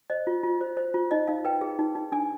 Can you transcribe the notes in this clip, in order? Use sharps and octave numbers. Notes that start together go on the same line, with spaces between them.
C5 D#5
F4
F4
C5
C5
F4
D#4 D#5
D#4 F5
B4 G5
G#4
D#4
D#4
D4 G#5